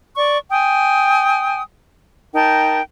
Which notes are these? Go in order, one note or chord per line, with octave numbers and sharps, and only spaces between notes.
D5 C#6
G5 G#5 D#6
D#4 A#4 G5 A5